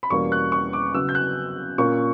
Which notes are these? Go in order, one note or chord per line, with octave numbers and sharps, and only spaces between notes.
B5
E2 B2 G3 A#3 C#4 C#6
F#6
C#6
D6
C#3 F#3 B3 E6
G6
F#6
A#2 A#3 C#4 C#6